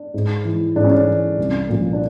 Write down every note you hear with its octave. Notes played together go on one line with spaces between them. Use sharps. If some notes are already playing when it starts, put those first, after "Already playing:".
Already playing: D4
G#2
E3
G#2 D4
C#4
D4
E3
C2
A#2 F3
D4